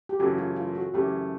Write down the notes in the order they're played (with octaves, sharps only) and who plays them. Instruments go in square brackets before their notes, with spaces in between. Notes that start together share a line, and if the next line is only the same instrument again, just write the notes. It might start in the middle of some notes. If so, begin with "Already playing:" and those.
[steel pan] G4
[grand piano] F#2 C#3 E3 A3 [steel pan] F#4
[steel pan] F4
F4
F#4
[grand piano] F#2 C#3 E3 A3 [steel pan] G4